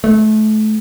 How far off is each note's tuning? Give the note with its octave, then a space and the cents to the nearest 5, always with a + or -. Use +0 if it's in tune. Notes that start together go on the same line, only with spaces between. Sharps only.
A3 -30